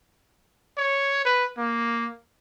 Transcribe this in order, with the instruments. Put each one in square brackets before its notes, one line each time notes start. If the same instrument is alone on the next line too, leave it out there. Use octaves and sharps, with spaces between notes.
[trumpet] C#5
B4
A#3